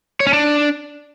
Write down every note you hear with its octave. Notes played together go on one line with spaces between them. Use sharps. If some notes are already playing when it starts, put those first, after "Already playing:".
C#5
C#4
D4